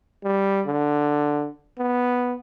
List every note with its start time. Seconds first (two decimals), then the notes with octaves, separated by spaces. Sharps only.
0.24 G3
0.66 D3
1.78 B3